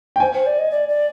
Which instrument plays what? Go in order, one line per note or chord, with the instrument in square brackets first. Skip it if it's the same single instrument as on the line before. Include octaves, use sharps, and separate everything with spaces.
[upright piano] G5
[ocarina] C5 [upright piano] G#5
[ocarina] C5
D5
D#5
D5
D5